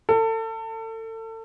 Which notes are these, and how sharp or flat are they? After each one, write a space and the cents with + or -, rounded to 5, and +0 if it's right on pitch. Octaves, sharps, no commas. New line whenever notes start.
A4 +30